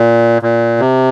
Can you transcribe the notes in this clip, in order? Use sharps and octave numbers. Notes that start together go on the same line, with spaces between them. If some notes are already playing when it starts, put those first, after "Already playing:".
Already playing: A#2
A#2
C3